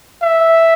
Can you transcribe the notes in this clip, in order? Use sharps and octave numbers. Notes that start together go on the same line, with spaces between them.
E5